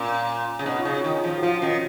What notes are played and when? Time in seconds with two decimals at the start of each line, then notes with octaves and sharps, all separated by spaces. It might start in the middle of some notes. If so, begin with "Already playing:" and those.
Already playing: A#2 C#4
0.59 C#3
0.65 B2 D#4
0.79 F4
0.85 C#3
0.94 F#4
1.04 D#3
1.09 F4
1.24 F3
1.38 F#4
1.43 F3 F4
1.62 D#3 C#4